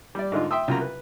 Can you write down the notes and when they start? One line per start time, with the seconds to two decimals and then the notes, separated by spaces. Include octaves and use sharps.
0.15 G3 D5
0.32 G#2 D3 D#4 F4
0.51 E5 G5 C6 D#6 E6
0.68 C2 C#3 F#3 F4 A#4 A#5
0.81 B4